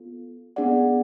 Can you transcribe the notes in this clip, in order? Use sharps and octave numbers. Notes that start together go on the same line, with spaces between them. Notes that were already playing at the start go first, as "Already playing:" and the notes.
Already playing: B3 F4 A4
B3 D4 G#4 D5 F#5